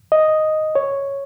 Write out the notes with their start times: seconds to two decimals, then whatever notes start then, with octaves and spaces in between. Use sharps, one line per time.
0.12 D#5
0.75 C#5